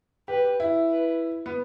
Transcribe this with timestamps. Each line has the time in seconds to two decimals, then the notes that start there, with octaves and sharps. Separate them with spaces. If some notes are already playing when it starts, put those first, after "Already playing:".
0.28 G4 B4
0.60 E4
0.90 B4
1.46 B3